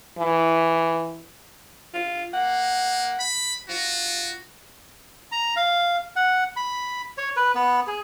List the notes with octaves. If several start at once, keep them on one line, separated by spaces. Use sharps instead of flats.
E3
F4
A#3 F#5
B5
F4 F#4
A#5
F5
F#5
B5
C#5
B4
B3
G#4